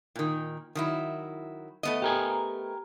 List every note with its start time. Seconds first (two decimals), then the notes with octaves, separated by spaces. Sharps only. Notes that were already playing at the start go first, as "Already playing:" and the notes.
0.15 A#2 D#3
0.75 D#3 F#3 E4
1.83 A3 B3 D#5
2.02 G4 A#4 G#5